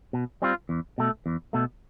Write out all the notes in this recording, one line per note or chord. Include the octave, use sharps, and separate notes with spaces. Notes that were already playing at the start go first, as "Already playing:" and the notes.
B2
G3 C4 F4
E2
B2 A3
E2
B2 A3